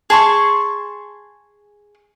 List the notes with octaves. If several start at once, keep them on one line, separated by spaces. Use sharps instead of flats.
G#4 A5 C6 C#6